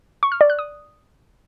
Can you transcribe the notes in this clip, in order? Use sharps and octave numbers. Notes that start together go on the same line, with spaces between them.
C#6
F6
D5
F#6
D#6